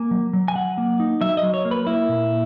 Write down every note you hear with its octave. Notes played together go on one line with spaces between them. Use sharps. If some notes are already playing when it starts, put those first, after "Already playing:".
Already playing: A#3 G#5
F#3
F#3
G#5
F#3 F#5
A#3
D#4
F#3 E5
D#5
F#3
C#5
A#3
B4
A#3 E4
A#2